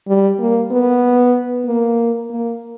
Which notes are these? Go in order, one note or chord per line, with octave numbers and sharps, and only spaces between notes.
G3
A#3
B3
A#3
A#3